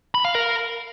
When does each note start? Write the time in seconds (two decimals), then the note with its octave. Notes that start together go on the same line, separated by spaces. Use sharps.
0.15 B5
0.25 F5
0.35 A#4